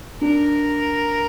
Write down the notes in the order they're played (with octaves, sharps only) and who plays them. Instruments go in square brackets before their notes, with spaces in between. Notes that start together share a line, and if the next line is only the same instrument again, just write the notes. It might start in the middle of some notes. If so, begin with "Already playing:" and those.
[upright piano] D4 [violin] A#4